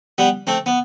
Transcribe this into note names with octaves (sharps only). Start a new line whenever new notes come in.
G3 B3
A3 C4
B3